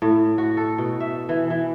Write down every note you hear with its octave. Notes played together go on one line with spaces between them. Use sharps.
A2
F#4
A4
B2
E5
E3
E3